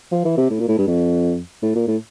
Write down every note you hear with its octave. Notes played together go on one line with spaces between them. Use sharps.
F3
E3
C3
A2
A#2
A2
G2
F2
A2
A#2
A2